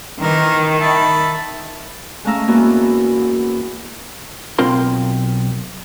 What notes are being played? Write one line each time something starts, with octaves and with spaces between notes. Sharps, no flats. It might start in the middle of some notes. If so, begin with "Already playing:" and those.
D#3 E3 A#4
E5 A5 B5
G#3 A3 C#4 F5 A#5 E6
E2 A#3 B3 F#4
B1 C4 F4 A#4 C6